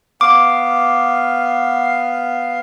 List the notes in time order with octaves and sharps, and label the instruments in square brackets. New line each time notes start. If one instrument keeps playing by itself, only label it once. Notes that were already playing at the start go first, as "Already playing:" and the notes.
[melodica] B3 F5 [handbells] D6